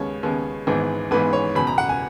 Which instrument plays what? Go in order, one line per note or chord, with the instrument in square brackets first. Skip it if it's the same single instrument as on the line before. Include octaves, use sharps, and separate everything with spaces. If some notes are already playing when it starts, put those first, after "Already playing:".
Already playing: [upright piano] D#2 C#3 G#3 B3 C#5
D#2 C#3 G#3 B3
G#1 G#2 E3 G#3 B3
G#1 G#2 E3 G#3 B3 B4
C#5
F#1 E2 B2 B5
A#5
F#5
G#5